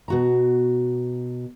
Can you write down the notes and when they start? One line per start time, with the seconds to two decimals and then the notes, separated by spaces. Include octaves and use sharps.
0.08 B2 F#4 A#5